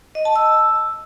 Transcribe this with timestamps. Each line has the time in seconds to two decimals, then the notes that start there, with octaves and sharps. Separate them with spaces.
0.15 D#5
0.25 A5
0.36 E6